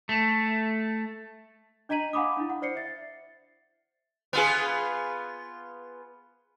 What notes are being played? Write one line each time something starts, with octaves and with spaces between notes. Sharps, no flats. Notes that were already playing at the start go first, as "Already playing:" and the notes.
A3
D4 D#5 A#5 B6 D#7 F#7
F5 F#5 G#5 B5 D6 D#6
D4 E4
F#5
C5 D5 C7 C#7
E5 A6
B3 F4 G#4